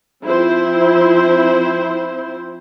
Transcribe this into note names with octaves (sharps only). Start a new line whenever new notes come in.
F3 C4 E4 C5